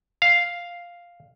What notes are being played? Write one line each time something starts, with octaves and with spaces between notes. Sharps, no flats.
F5